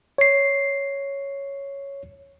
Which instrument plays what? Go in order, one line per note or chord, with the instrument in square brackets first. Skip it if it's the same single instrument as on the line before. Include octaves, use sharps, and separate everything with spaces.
[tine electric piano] C#5 C7